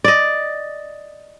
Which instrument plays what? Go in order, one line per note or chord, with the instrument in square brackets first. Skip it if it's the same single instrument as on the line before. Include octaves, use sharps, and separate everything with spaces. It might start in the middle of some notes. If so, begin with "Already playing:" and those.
[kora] D5 D#5